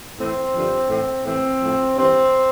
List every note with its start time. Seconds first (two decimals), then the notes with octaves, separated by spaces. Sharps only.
0.19 A2 E3 C4
0.54 G2 D3 F3
0.89 A2 E3
1.25 A2 E3 C4
1.61 A2 F3
1.97 G2 E3 C4